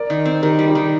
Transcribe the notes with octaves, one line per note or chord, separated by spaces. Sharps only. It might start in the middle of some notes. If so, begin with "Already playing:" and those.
Already playing: A#4 D5
D#3
C4
D#3 G4 A#4
G3
D#4 G4
D#3